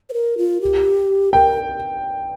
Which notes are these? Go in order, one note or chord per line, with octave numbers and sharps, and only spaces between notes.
C5
A#4
F4
G4
A#4 G5